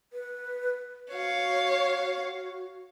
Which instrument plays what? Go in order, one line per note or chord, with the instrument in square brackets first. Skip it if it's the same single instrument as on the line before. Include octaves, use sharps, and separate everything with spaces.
[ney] B4
[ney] F#4 [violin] C#5 F5